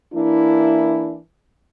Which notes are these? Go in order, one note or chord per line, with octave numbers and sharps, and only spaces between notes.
E3 A#3 D4 E4